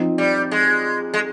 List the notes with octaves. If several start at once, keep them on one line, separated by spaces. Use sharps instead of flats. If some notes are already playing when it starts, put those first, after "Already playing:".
Already playing: F3 C4 D#4
G3
G#3
G#3